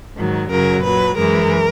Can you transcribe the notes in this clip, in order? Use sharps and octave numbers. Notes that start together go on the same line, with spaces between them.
G#2 D#3 F#3
F#2 C#3 F#3 A#4
A#2 F#3 B4
F#2 E3 G#3 A#4